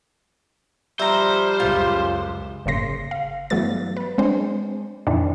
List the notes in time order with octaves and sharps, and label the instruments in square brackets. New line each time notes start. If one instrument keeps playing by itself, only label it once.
[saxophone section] F3 G3 [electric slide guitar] C5 [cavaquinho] E5 A#5
[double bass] C#2 F#2 [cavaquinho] F4
[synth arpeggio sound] G1 A2 C#3 A#3 C6 A#6
F5
G2 E3 F#3 A3 B3 A6
B4
G#3 C4 D4 C5
F2 A#2 D#3 E3 C4 D4